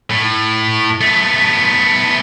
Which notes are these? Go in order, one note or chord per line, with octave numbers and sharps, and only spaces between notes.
A2
A3 B3